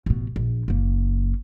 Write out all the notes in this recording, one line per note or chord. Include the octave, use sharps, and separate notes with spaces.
A1 B2
A#1
F#1 A#3